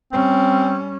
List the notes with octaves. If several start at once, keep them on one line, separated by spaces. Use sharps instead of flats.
G3 C4 C#4